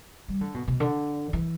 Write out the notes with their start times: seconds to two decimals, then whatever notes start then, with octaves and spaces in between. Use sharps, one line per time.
0.29 G3
0.41 D3
0.54 B2
0.68 B2
0.80 D3
1.33 E3